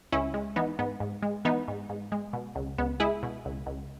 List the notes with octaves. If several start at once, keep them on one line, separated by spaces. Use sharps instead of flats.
C#2 C#4 E4
G#3
E3 B3 D#4
G#2 B3
G#2
G#3
E3 B3 D#4
G#2
G#2
G#3
B2
C#2
C#2 B3
G#3 E4 G#4
B2
C#2
C#2